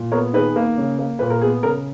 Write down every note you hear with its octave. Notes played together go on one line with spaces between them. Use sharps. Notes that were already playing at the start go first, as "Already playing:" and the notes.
Already playing: A#2
B3 A#4 C#5
D#3 G#4 B4
A#3
C#3
A#3
A#2 B4
A#4
B3 G#4
C#3 A#4